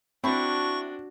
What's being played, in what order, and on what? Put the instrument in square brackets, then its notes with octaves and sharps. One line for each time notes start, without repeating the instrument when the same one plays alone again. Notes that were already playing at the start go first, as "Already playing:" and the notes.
[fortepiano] C4 [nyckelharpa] D4 F#4 [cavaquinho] E4 A5 [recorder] C#6